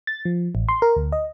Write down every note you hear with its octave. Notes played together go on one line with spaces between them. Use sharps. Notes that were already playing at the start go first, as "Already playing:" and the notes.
A6
F3
A1
C6
A#4
D2
D#5